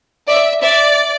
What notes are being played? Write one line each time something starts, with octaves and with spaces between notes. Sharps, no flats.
D5 E5
D5 E5